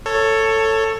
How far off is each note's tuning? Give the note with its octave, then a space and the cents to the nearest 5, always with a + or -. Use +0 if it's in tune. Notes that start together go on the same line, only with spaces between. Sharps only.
A4 +15 C#5 +0